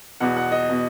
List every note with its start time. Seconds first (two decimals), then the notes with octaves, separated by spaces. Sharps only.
0.20 E2 B2 F#5
0.37 F#5
0.52 D#5
0.69 B2